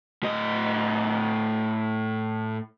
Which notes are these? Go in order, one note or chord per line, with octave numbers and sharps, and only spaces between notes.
A2 D#5